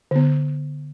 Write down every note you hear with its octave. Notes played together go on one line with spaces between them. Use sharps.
D3 B3